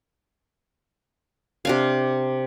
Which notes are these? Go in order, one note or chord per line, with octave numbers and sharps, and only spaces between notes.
C3 D4 F5